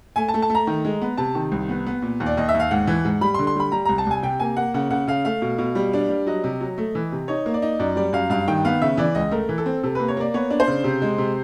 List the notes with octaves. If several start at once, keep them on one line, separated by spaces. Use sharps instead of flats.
A3 G#5
A5
A3
A5
A3
A#5
D#3
G#3
B3
C3 A5
D#3
C2
B3
B3
A#2
D#2
D5
D#2 D#5
E5
D#2
F5
G#2 F#5
E3
G#2
G3 B5
C6
D3
C6
G3 B5
G3 A#5
C2 A#5
A5
C2 G#5
C3 G5
A#3 G#5
A#3 F#5
C#3 F#5
C#3 F#5
C#3 F5
A3 F5
B2
B2
G3
D4
G3
F#3 D#5
C3
F#3
A3
E3
C3
D#4 C#5
A#3
D5
D#4
F#2 D5
G3 D5
F#2 F5
G2 F5
D#3 G5
B3 F5
C#3 E5
E3 D5
C#2 D#5
A3 A#4
E3
A4
C4
C3 A4
A#3 B4
C#5
A#3 D5
B3 C#5
D4
C5
C#3
C3
G#3
C3